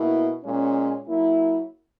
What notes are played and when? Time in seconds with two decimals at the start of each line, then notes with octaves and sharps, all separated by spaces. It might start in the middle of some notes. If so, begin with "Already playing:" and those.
Already playing: B2 A#3 E4
0.43 A#2 G#3 C#4
1.07 F#3 A#3 E4